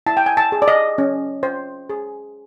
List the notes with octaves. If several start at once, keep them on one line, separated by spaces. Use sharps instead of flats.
E4 A5
G5
G#5
A5
G#4
D5
D#5
C#4
C5
G#4